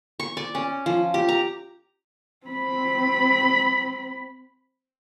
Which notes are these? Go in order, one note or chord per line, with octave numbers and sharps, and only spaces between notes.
C#6
D5
C#4
F3
G4
A#5
C4 B5